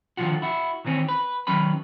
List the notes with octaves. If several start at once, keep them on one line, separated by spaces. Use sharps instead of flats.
D3 D#3 F3 F4 F#4
E4 F#4
D#3 E3 C4 C#4
B4
D#3 F#3 C#4 B4 B5